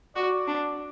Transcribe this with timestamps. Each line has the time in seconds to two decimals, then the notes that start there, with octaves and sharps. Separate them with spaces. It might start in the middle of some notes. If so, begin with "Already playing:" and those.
0.15 F#4 D5
0.47 D4